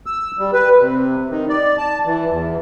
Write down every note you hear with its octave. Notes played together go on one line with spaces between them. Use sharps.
E6
G3
B4
C3
D#3
D5
A5
E3
E2